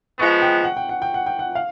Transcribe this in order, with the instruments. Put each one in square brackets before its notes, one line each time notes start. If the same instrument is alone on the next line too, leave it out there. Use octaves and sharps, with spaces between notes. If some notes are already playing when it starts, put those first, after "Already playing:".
[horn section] F3 G#3 B3 [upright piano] C#6
[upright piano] G5
F#5
G5
F#5
G5
F#5
G5
F#5
F5